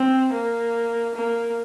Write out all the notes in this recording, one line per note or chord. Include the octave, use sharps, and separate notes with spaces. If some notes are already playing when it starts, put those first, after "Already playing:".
Already playing: C4
A#3
A#3